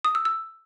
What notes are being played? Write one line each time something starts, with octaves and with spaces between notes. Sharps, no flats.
D#6
E6
E6